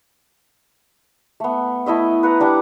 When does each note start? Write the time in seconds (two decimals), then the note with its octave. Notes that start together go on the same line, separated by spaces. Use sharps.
1.40 A3 B3
1.86 A3 E4 D#5 E5
2.23 B4 F#5 A#5
2.40 G3 D4 F#5 D6